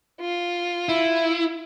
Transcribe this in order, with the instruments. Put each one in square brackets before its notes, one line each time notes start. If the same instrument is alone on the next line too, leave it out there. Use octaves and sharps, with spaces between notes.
[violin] F4
[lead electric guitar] E4